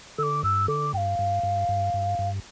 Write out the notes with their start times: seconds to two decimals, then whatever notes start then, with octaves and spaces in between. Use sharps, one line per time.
0.18 D3 D6 E6
0.43 G2 E6
0.68 D3 D6
0.93 G2 G5
0.97 F5
1.19 G2
1.43 G2
1.69 G2
1.94 G2
2.19 G2